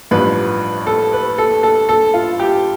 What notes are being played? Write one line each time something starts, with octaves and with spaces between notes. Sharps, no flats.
A1 G2 F3 B4
A4
B4
A4
A4
A4
F4
G4